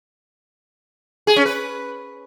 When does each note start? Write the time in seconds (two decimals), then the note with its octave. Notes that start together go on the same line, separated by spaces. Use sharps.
1.27 G#4
1.36 C#4
1.46 B4